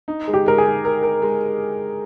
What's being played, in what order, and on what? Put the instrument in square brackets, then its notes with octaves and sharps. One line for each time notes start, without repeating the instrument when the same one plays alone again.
[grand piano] D#4
G#3
[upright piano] G4
[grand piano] G#3 [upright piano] A#4
[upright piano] G#4
[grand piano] G#3
A#4
A#4
G#3